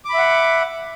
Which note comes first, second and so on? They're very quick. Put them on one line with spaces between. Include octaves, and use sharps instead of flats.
D6 B5 E5 F#5